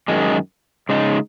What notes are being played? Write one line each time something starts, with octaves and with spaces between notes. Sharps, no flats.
F#2 D#3 G#3
C#3 G#3 D#4